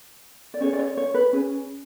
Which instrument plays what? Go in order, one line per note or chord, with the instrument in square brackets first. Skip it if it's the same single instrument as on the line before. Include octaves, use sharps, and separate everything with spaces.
[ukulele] D5
C#4 G#4 B4 C#5
D5
C#5
C#5
B4
C#4 G#4 B4